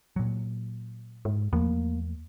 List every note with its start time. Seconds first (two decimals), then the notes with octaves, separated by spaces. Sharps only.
0.16 A#2 F#3
1.25 G#2
1.53 E2 F3 A3 A#3